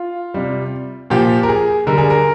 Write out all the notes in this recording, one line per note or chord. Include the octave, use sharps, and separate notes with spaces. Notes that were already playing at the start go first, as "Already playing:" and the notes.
Already playing: F4
C3 G3
A#2 F3 G4
A#4
G#4
D3 G3 A#4
G#4
A#4